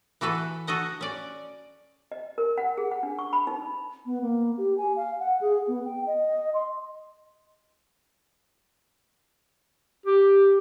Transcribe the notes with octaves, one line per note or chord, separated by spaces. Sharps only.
E3 F#4 A4 B4
F#4 A4 D#5 F#5
C#4 D5
D#5
A#4
F#5
G#4
F#5
D4
C#6
B5
D#4
B3
A#3
G4
G#5
F5
F#5
G#4
B3
G5
D#5
C6
G4